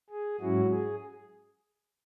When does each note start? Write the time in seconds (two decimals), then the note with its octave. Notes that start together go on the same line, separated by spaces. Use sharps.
0.10 G#4
0.40 G#2 F#3 C#4 E4 F#4
0.69 G#4